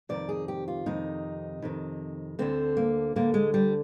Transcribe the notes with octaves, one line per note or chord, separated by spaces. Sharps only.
F2 C3 D#3 D5
G#4
G4
F4
F2 C3 D#3 D#4
F2 C3 D#3
D2 D3 C4
A#3
D2 D3 A#3
G#3
G3